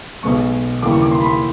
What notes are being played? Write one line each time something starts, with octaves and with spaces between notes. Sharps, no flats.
B1 B2 G#3 C#6
D#2 C#3 E3 G3 D6
C#6
D6
C6
B5
C6